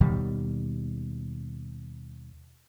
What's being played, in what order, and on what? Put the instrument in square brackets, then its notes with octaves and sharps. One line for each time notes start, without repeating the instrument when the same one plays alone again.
[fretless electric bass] D#2 B2 D#3 G3